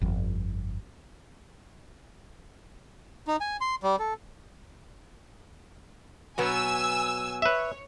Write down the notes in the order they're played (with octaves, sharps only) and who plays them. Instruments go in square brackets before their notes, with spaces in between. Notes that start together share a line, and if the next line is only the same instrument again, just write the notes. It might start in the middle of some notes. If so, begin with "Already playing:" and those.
[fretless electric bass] G1 F2
[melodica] D#4
G#5
C6
G3
A4
[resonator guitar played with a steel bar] B2 F#3 B3 [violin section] G#5 E6
[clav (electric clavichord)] B4 E5 [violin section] C#5